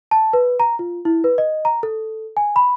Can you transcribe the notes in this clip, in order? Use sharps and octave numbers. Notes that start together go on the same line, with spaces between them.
A5
B4
A#5
F4
E4
B4
D#5
A#5
A4
G#5
B5